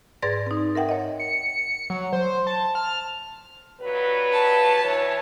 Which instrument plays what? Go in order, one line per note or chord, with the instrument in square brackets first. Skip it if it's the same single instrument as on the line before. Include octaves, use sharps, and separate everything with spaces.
[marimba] G#2 G#4 B4 D5 A6 A#6
C4 D#4
A#4 E5 F#5 G5
C#5 D#5
[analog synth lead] C#7
F#3
C5
A5
F6
[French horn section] G2 F#3 B4
[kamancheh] A5
[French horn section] E3 C#5